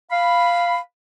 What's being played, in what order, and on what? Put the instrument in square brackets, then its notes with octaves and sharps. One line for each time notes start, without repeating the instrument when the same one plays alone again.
[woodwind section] F5 B5